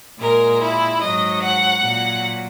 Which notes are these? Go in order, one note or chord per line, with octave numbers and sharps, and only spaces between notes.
A#2 G#3 A#4
E4
G#2 F#3 D#5
F#5
A#2 F#3